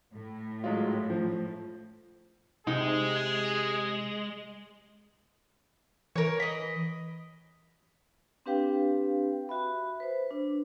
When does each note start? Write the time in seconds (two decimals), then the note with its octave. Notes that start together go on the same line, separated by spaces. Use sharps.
0.14 A2
0.64 F#3 G#3 F4
1.10 F3
2.67 C3 G#3 D#4 G#4
6.16 E3 A#4 C#5
6.40 D#5 B5
8.46 C4 D4 G4 B4 F5 G5
9.49 F#4 E5 B5
10.00 B4 C5
10.31 D4